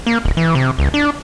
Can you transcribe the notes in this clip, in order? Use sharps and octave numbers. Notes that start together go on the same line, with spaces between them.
A#3
D1
E3
C3
C#2
D4